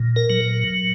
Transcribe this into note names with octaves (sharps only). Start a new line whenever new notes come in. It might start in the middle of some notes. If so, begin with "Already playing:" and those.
Already playing: A#2
A#4
F#3